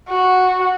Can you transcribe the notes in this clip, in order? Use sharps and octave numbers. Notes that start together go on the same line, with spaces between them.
F#4